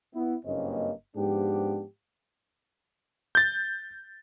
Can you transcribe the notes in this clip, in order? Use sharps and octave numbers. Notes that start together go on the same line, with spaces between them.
B3 E4
F#1 G2 A#3 C4 C#4 D#5
G#2 F3 B3 D4 G4
G6 A6